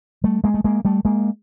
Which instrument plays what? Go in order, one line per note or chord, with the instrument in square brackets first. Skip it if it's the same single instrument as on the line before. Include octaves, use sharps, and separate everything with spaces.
[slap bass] G3 A3
G#3 A#3
A3
G#3 A#3
G3 A3
G#3 A#3